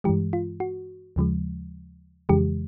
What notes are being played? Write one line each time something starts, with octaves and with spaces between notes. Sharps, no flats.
G2 E3 G#3 G4
F4
F#4
D#2 C#3 F3 G#3
F2 C#3 E3 G#3 G4